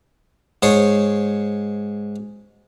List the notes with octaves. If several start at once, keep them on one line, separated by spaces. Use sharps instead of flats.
G#2 C5 C#5 C#6